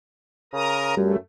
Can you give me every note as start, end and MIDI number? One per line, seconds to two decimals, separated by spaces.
0.53 0.95 49
0.53 0.95 70
0.53 0.95 82
0.53 0.95 87
0.97 1.16 42
0.97 1.16 55
0.97 1.16 57